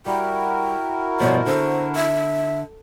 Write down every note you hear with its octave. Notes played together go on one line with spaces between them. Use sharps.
G3 E4 F#4 A#4 G5
G2 B2 F3 C#5
D3 C5
E5